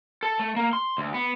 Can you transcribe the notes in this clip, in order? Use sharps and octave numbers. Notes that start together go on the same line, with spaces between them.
A4
A3
A#3
C6
D2
B3